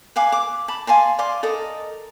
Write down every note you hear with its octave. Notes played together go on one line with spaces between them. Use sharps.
B4 F5 G#5 D6
D6
A5 B5
F5 G#5 A5 C6
D5 F5 C6 D6
A4 A#4 D#5 A5